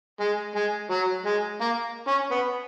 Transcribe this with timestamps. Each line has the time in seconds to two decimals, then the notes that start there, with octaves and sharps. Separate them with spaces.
0.20 G#3
0.55 G#3
0.91 F#3
1.26 G#3
1.61 A#3
2.08 C#4
2.32 B3